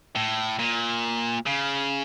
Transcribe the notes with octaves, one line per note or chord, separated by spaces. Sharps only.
A2
A#2
C#3